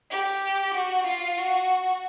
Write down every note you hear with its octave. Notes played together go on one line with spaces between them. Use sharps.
G4
F#4
F4
F#4